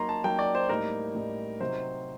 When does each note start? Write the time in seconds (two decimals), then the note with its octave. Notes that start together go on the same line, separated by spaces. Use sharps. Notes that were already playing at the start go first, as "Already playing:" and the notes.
Already playing: F#3 A#3 D#4 A#5 C6
0.09 A5
0.24 F#3 A#3 D#4 G5
0.39 D5
0.55 C5
0.69 A2 G3 A#3 D#4 A#4
1.15 A2 G3 A#3 D#4
1.60 C3 F#3 C4 D#4 C5